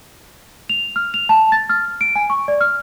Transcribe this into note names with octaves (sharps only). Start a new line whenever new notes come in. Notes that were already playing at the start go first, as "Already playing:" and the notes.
F7
F6
F7
A5
A6
F6
D7
G#5
C#6
D5
F6